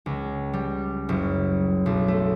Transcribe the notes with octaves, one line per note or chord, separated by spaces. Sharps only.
C#2
G3
F#1
B1
A3